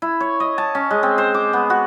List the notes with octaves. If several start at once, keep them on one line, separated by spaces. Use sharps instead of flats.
E4
C#5
D#5
A5
C#4
G#3
C4
C5
D6
B3
F#4